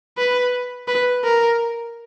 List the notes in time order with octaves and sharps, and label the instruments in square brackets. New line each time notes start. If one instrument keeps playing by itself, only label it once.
[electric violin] B4
B4
A#4